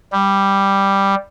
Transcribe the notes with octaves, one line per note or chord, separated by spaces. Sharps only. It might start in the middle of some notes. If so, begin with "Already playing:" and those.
G3